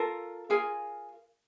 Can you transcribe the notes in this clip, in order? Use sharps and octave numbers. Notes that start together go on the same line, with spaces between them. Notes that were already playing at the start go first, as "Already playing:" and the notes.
Already playing: F4 A4 A#4 A5
F4 G#4 A#4 G#5